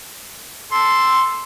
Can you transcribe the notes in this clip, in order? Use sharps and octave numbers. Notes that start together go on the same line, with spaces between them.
A4 C6